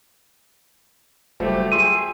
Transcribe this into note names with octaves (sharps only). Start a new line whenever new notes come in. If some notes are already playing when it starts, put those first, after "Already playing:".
F#1 F#3 G3 A3 G4 C5
F4 G#4 G5 C6 E6 D#7